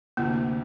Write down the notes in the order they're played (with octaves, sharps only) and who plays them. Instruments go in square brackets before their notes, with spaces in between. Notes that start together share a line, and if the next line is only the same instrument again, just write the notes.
[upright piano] D2 C3 E3 [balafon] A#3